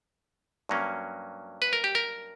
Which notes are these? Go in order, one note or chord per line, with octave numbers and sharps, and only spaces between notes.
G2 F#3 A#3 C#4
B4
A#4
G4
A#4